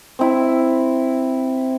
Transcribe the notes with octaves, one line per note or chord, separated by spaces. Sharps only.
C4 E4